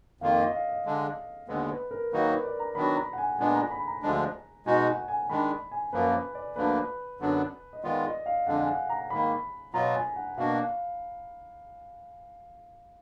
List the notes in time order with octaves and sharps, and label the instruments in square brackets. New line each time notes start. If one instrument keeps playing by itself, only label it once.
[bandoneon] F2 D#3 A#3 F4 [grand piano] F5
[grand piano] D#5
F5
D#5
[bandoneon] D3 G#3 D4
[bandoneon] D#2 D3 G#3 B3 [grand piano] B4
[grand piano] B4
A#4
[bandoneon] D#3 F#3 A#3 D#4 F#4 [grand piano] B4
[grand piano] B4
D5
A#5
[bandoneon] D#3 F#3 B3 D4 F#4 [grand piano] B5
[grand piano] A#5
F#5
G#5
[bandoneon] A#2 G#3 B3 D4 [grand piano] G#5
[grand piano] A#5
B5
A#5
[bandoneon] D2 D3 F3 G#3 D4
[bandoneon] B2 G#3 D#4 F#4 [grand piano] G#5
[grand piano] F#5
G#5
[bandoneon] D#3 G#3 D4 [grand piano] B5
[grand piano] G#5
[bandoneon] F#2 F3 A#3 [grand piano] B4
[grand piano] D5
[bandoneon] D2 D3 F3 A#3 D4 [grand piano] B4
[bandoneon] F#2 D3 F#3 B3 D4
[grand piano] D#5
[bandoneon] D#3 G#3 B3 F4 [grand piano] D5
[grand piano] D#5
F5
[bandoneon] F2 D3 G#3 D4 [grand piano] F#5
[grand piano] G#5
F#5
A#5
[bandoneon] G#2 D#3 A#3 [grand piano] B5
[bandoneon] B2 F#3 B3 F4 [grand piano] A#5
[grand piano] G#5
F#5
[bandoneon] B2 A#3 D4 F#4 [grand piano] F5